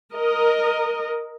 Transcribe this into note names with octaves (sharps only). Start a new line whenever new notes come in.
A#4 D#5